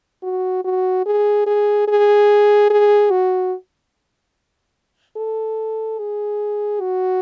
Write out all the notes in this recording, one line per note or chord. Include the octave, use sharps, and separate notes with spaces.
F#4
F#4
G#4
G#4
G#4
G#4
F#4
A4
G#4
F#4